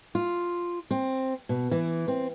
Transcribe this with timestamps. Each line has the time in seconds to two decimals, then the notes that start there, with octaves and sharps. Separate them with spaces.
0.15 F4
0.91 C4
1.49 B2
1.71 E3
2.08 C4